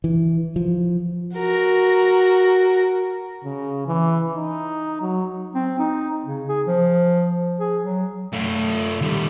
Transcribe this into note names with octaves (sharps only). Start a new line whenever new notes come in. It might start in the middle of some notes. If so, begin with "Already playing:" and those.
E3
F3
F#4 A#4
C#3
E3
D#4
F#3
C4
D#4
C#3
G#4
F3
G#4
F#3
A3 F4
D#3 G3